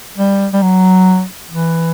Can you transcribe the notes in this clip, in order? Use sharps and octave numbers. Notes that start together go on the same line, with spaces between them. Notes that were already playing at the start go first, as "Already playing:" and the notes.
G3
G3
F#3
E3